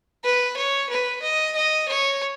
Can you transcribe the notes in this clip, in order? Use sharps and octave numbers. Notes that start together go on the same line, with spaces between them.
B4
C#5
B4
D#5
D#5
C#5